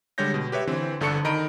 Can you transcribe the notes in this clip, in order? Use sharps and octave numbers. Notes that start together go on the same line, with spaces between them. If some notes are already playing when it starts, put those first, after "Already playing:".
D3 G3 G#3 C#5 G6 A#6
B2
G4 B4 C#5 E5
D3 E3 C4
G1 D3 D4 A4 C#6 C#7
D#3 D#5 A#5 B5 D7